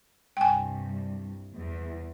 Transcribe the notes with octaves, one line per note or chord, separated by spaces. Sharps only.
C2 G2 G5 G#5
E2